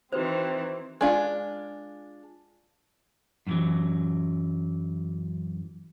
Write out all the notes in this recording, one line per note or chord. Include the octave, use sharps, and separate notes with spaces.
D#3 E3 C4 F#4 B4 C5
G#3 D4 F4
F#2 A2 D3 E3 F#3